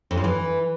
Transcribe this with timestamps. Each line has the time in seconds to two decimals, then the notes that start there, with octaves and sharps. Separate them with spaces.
0.11 F2
0.17 F3
0.24 E3